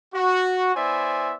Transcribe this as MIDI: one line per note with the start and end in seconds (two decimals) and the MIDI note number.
0.14 0.73 66
0.75 1.34 59
0.75 1.34 64
0.75 1.34 72
0.75 1.34 74
0.75 1.34 76
0.75 1.34 80